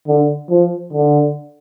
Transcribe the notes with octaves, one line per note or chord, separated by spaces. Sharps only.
D3
F3
D3